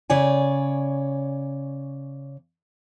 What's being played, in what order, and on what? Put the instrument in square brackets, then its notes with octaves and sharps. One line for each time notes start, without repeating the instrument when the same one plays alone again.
[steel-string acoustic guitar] C#3 C#5 D5 G#5